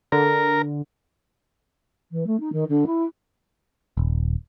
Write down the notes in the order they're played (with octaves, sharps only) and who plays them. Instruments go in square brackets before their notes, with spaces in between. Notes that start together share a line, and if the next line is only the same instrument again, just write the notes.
[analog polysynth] D3 [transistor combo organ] A#4
[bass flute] E3
A3
D#4
D#3
D3
E4
[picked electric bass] D#1